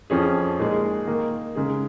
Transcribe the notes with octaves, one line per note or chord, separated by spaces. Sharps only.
F2 F3 C#4 G#4
A#2 G#3 D#4 G#4
D#3 A#3 D#4
C#3 G#3 D#4 G#4